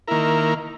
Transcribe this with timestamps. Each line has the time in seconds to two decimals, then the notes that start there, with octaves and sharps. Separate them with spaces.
0.08 D#3 A#3 E4 A#4